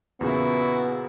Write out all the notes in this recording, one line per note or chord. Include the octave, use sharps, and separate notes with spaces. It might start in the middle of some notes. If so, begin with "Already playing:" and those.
E2 A#2 C#3 B3 E4 F#4